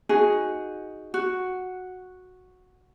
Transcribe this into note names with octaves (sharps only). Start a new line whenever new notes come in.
D#4 F#4 G#4
F#4